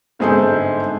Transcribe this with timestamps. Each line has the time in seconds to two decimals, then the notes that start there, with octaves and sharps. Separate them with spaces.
0.19 G1 G#2 C4 G#4 A4 G6